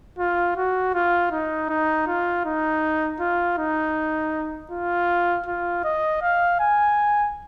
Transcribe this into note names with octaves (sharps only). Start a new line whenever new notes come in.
F4
F#4
F4
D#4
D#4
F4
D#4
F4
D#4
F4
F4
D#5
F5
G#5